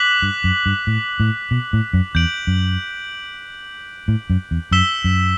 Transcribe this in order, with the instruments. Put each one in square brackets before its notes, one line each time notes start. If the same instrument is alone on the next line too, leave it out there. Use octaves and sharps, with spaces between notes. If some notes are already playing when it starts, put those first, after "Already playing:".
Already playing: [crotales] D6 F#6 B6 F#7
[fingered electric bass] G2
F#2
G2
A2
A2
B2
A2
F#2
[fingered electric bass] E2 [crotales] G6 D7 F#7
[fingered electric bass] F#2
A2
F#2
E2
[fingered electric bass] F#2 [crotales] E6 B6 E7 G7
[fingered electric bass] F#2